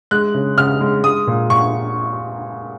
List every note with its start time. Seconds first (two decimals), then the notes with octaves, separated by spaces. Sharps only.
0.11 G#3 F#6
0.34 C#3
0.57 C#3 F6
0.81 G#3
1.04 G#3 D#6
1.27 A#2
1.50 A#2 C#6